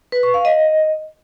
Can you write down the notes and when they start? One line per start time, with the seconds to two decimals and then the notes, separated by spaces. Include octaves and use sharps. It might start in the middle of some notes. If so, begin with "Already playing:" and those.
0.12 B4
0.23 C#6
0.34 F5
0.45 D#5